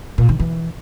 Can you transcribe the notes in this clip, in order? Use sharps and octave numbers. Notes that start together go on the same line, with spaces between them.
A#2
D#3
E3